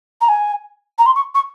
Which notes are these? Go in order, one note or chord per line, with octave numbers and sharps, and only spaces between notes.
A#5
G#5
A#5
C6
C#6
C#6